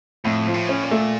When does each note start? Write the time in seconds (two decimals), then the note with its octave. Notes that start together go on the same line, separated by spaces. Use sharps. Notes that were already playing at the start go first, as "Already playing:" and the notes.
0.25 F2 A2
0.47 F3
0.54 A2
0.69 C#4
0.83 A#2
0.91 A3